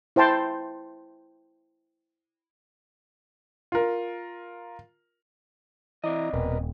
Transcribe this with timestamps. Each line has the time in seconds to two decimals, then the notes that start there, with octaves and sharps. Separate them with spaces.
0.16 E4 C5 G5 A5 C6
3.72 F4 A#4
6.04 C3 E3 E4 D5 D#5 A#5
6.34 D#1 B2 A#4 B4